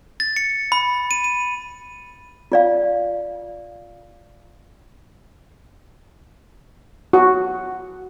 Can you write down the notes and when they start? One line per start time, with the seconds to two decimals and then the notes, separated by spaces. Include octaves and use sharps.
0.20 A6
0.36 C#7
0.72 B5
1.11 D#7
1.24 D#7
2.52 F4 D5 F5
7.13 F#4